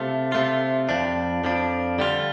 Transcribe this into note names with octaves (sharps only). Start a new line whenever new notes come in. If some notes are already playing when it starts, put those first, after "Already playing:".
Already playing: C3 A3 F4
C3 A3 F4
F2 F3 D4
F2 F3 D4
D3 G3 F4